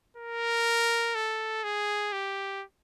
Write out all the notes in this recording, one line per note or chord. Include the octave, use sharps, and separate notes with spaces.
A#4
A4
G#4
G4